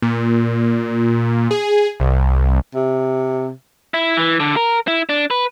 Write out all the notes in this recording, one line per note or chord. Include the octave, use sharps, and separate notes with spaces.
A#2
G#4
C2
C3
E4
E3
D3
A#4
E4
D4
B4